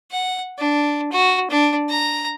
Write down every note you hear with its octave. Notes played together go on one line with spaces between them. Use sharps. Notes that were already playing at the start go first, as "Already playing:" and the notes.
F#5
D4
F#4
D4
A#5